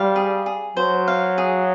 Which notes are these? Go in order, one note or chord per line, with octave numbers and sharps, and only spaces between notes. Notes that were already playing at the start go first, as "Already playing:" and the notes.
Already playing: G3 C5 F5
G#4
G#4
F#3 C5
F5
G#4